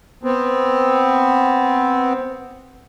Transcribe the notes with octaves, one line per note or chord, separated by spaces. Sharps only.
B3 C4